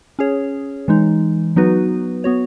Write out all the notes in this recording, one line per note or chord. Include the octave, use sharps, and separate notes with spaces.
C#4 G#4 C#5
E3 G#3 D#4
F#3 B3 D#4 F#4 B4
B3 F#4 C#5